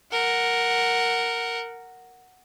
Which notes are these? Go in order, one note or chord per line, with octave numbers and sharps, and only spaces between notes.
A#4 F#5